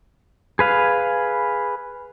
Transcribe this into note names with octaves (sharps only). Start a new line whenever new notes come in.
G#4 B4 F5